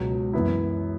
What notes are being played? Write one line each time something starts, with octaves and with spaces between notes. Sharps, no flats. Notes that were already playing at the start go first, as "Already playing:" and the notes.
Already playing: C#2 B2 F#3
F#2 E3 B3 E4